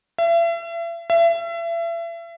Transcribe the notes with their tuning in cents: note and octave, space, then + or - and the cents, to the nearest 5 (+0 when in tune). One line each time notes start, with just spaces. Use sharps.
E5 +40
E5 +35